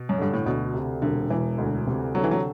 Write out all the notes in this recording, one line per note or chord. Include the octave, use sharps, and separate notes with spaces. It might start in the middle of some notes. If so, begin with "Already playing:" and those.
Already playing: B2
F#2
G2 D3
A2
D2 B2
C3
E1 D3
E1 E3
D2
C3
D3 F#3
E3
F#3